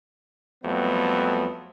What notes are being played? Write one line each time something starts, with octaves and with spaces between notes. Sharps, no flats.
F2 F#3 G3 A3 B3